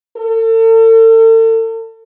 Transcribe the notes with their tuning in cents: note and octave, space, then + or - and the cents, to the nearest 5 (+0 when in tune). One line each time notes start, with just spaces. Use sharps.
A4 +40